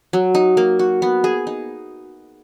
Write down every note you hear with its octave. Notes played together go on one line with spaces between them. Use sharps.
F#3
D#4
A#3
F#4
B3
G#4
D#4